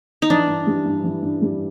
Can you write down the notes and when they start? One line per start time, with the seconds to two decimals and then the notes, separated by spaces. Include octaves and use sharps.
0.22 D#4
0.30 E3 D4
0.48 G2
0.67 G3
0.86 G2
1.04 E3
1.23 G2
1.42 G3